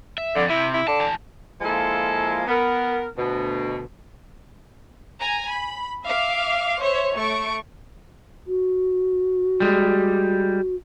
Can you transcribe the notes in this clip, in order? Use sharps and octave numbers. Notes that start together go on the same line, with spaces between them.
E5
F2 D3
C3 E4
E4
D3 A5
E3 A5
F3 G#3 A#3 E4 F4 A4
B3 A#4
D2 B2
G#5 A#5
B5
E5 F5 D6
C5 C#5 E5
A3 C#6 D7
F#4
G3 G#3